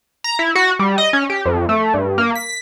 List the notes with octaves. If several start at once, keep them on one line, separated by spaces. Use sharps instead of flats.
A#5
E4
F#4
G3
D#5
C#4
G4
F2
A3
G2
A#3
B6